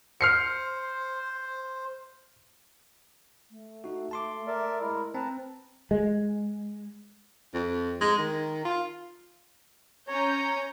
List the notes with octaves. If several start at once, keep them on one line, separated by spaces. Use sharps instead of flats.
C5 F6 C7 C#7
A3
D#4 F#4
A5 C6 D6
A#4 D5 E5
G#3 E4 A#4
C4 B4 A5 A#5
G#3
F2
G#3
D#3
F4
C#4 C#5 A#5 G6